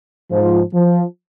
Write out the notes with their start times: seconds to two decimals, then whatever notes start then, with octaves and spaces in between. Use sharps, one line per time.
0.31 G#2 F3
0.74 F3